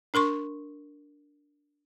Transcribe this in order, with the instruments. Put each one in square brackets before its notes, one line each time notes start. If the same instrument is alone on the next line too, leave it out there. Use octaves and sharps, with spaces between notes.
[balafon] D4 A#4 C6 C#6